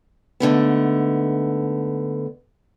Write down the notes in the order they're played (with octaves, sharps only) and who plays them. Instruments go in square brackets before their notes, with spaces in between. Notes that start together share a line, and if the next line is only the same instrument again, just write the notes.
[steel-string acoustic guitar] G#2 D3 A3 B3